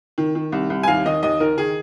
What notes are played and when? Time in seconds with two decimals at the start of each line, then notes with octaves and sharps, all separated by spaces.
0.18 D#3
0.35 D#3
0.52 C2
0.70 C2
0.83 G#5
0.88 D#2 F5
1.05 D#3 D#5
1.23 D#2 D#5
1.40 D#3 A#4
1.57 D#3 G#4